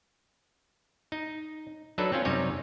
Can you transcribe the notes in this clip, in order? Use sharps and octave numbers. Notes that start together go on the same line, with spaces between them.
D#4
F#3 D4 D#4 A4 B4
C4 C#4 F4
F#2 C3 G3 D#4 C#5 G#5